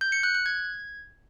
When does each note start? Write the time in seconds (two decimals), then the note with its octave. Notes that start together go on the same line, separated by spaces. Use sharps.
0.01 G6
0.12 C#7
0.23 F#6
0.35 F#6
0.46 G#6